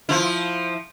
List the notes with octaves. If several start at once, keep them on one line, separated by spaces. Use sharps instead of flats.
F3 E4